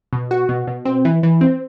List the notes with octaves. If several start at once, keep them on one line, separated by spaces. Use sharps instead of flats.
B2
F#4
B2
B2
C4
E3
E3
C4